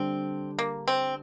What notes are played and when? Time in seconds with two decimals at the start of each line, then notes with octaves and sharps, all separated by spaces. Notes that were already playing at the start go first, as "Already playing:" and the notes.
Already playing: D3 G3 C4 D4 A4
0.59 A#3
0.88 C4